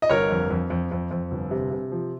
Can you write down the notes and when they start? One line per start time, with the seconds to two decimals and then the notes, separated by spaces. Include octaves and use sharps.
0.02 D#5
0.09 G1 A#4 C#5
0.30 F2
0.50 F2
0.70 F2
0.91 F2
1.11 F2
1.31 G1
1.51 C3
1.71 C3
1.92 F3